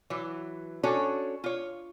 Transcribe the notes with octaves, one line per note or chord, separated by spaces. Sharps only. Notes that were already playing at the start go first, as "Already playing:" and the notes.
E3 F#3
C#4 D4 F#4 A4 C#5
F4 C#5